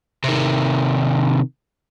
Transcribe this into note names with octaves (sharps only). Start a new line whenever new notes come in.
C3 D#3